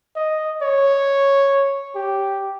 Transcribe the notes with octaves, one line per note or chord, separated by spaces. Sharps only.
D#5
C#5
G4